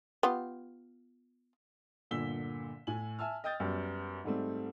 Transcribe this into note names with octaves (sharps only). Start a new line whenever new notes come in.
B3 F4 G4
G1 A#2 D3 E6 B6 G7
A2 G#5 F#7
E5 G#5 A5 E6 F6
D#5 G5 D#6 G6 A6
F#2 G3 B3
G#2 G3 A3 C4